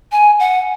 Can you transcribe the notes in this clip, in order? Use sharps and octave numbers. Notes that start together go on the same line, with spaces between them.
G#5
F#5